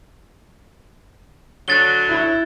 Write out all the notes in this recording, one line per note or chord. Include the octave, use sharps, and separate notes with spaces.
D3 F#3 F#6 A6 G7
E4